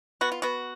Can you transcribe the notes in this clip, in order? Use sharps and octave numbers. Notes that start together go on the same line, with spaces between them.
B3 F#4
F4
B3 F#4